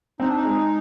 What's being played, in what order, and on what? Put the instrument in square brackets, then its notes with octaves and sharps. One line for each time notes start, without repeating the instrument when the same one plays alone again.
[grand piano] C4 [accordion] D#4
[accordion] D4
D#4
[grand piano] G#3